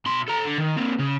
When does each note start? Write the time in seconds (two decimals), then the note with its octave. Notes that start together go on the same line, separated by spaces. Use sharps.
0.06 B2 C6
0.28 A4 A#5
0.44 D3
0.58 D#3
0.77 A#3 C4
0.99 C#3